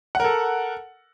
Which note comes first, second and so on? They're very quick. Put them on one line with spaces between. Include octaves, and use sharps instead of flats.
F#5 A#4 A4